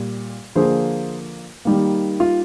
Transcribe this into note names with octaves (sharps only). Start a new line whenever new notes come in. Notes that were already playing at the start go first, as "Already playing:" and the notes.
Already playing: A#2 G3
D3 F3 A#3 G#4 C5
D#3 G3 A#3
F4